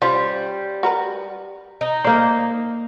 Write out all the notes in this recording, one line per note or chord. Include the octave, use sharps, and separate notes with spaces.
G3 C#4 F4 C5
F#4 A#4 B4
D#4
A#3 C5 D5